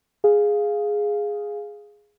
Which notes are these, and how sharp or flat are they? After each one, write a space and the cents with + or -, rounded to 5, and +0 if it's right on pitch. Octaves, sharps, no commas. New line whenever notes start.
G#4 +0 F5 +0